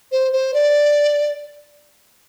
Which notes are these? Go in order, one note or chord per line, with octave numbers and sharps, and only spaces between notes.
C5
C5
D5